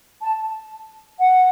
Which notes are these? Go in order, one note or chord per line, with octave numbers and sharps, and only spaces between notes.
A5
F#5